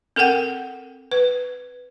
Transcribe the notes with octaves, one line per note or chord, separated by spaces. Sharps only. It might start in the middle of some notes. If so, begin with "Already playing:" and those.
C4 A4 A#4 F#5 G5
B4